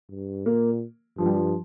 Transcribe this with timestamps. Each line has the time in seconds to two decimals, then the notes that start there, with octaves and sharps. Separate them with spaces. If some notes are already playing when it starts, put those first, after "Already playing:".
0.10 G2
0.46 A#2 A#3
1.18 G2 F3
1.26 G3
1.34 F3